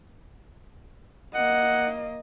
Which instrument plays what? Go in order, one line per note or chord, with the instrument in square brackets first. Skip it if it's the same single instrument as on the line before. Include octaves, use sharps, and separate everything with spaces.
[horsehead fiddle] A#3 D#5 [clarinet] F#5